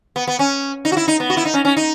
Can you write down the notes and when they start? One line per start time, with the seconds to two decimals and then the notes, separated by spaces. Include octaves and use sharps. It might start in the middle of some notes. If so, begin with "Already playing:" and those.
0.16 B3
0.27 B3
0.39 C#4
0.85 D#4
0.92 F#4
0.97 E4
1.08 D#4
1.20 B3
1.30 F#4
1.37 E4
1.45 D#4
1.54 C#4
1.65 C#4
1.77 D#4